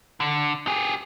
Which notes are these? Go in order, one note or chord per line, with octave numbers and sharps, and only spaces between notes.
D3
G4 G#4